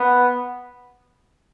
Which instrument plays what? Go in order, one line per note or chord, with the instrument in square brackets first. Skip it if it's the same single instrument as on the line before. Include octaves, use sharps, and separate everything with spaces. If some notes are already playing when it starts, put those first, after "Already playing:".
Already playing: [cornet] B3